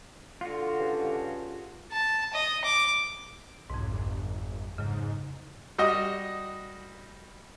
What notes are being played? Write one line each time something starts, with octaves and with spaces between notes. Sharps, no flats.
D3 F4 F#4
G2 C#3
A5
D#5
D6
B1 F2 G#2
G1
G#2 C#3 F#3
G3 F#4 D#5